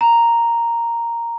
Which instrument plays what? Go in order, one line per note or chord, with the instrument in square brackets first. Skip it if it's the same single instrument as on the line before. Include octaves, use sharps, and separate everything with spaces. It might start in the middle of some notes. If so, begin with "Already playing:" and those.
[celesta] A#5